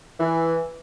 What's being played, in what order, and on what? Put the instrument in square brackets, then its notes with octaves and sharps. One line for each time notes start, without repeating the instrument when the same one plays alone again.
[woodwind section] E3